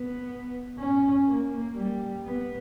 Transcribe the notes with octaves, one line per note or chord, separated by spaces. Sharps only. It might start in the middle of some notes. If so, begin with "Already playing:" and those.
Already playing: B3
C#4
A#3
G3
B3